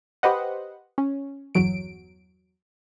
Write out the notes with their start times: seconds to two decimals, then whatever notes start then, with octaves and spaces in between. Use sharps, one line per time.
0.23 G4 B4 C5 D#5 F#5
0.98 C#4
1.55 G1 E2 F#3 D7